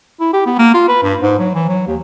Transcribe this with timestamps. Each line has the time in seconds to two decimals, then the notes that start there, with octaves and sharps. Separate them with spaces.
0.20 E4
0.33 G4
0.46 B3
0.59 A#3
0.74 F4
0.88 B4
1.03 G2
1.21 G#2
1.39 F#3
1.55 E3
1.68 F#3
1.87 D#2